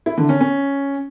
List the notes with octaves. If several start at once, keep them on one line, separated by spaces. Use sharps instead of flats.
E4
D3
C#4
C#4